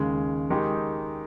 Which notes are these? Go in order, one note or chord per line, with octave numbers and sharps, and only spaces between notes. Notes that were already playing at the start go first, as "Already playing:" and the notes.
Already playing: D#2 C#3 G#3
D#3 G#3 D#4 G4